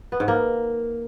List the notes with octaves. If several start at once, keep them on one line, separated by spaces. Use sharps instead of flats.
B3
G#2
A#3